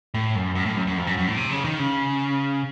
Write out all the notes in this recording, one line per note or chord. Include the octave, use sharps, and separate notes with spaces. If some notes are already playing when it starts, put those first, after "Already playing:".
A2
F#2
F#2
A2
F#2
F#2
F2
F#2
F#2
A2
C3
C#3
D#3
C#3